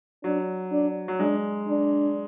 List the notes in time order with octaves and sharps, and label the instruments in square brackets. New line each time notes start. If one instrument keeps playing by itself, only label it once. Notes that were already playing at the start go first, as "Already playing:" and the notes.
[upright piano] F#3 [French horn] D4
[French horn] D4
[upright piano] F#3
[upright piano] G#3 [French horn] D4
[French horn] D4